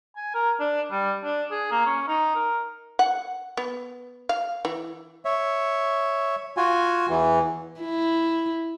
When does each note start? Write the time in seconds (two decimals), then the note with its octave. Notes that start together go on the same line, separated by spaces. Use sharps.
0.16 G#5
0.34 A#4
0.60 D4
0.91 G3
1.24 D4
1.51 G#4
1.71 A#3
1.86 C#4
2.08 D#4
2.35 A#4
2.99 F#5
3.57 B3
4.29 F5
4.65 E3
5.25 C#5 E5
6.57 F4 F#4 G#5
7.10 E2 E3
7.81 E4